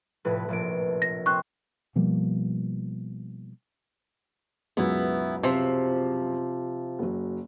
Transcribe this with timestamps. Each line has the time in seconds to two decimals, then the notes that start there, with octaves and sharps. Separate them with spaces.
0.25 F1 A2 B4
0.48 F1 A#1 D7
1.02 A#6
1.26 C4 C#6 F#6
1.96 B2 F3 G3 A#3
4.77 C#2 F#2 B2 B3 E4
5.43 C3 F3
6.99 F#1 F#3